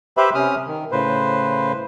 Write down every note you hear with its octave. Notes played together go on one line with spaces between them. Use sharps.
G4 B4 C5 E5 B5
C3 C#4 D#6 F6
D#3
A2 C#3 B4 C5